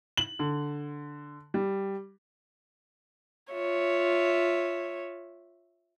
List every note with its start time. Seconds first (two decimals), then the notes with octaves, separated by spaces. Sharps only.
0.17 F#7
0.39 D3
1.54 G3
3.52 F4 C#5 E5